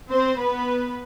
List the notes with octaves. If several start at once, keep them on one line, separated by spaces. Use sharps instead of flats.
C4 C5
B3 B4